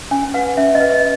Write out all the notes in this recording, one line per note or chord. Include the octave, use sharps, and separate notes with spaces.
C#4 G#5
B4 F#5
C#4 E5
D#5
B4
D#5